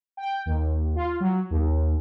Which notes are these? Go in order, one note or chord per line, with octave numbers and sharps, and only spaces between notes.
G5
D#2
F4
F#3
D#2